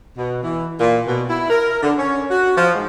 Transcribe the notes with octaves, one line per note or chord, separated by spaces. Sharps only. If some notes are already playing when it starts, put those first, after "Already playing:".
B2
E3
A#2
B2
E4
A#4
D3
C#4
F#4
F3
G#2